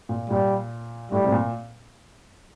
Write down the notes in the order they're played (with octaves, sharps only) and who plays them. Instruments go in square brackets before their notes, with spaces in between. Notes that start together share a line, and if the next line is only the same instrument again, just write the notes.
[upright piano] A#2
[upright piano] A#2 [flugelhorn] G3
[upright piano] A2 [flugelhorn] G3
[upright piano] C3
A#2